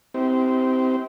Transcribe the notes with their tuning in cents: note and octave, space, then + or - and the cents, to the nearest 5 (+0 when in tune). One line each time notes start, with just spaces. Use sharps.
C4 -15 E4 -45 G4 -15